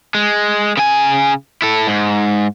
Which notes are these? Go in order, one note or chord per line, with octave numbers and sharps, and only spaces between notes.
G#3
C#3 G#5
E4 A4
G#2